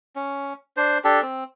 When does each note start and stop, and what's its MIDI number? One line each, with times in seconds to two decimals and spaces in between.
0.16 0.53 61
0.77 0.98 62
0.77 0.98 72
1.04 1.21 62
1.04 1.21 67
1.04 1.21 69
1.22 1.44 60